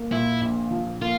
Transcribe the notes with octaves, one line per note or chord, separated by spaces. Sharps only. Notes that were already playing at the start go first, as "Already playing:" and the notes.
Already playing: A#3
A#2 E4
A#1
F3
A#3 F4